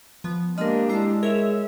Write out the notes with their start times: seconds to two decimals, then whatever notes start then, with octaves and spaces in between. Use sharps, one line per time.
0.24 F3 B3
0.58 G#3 A#3 D4 G4 A#4 D#5 F6
0.89 G#3 E4 A#5 C7
1.23 G#4 A#4 C#5 E5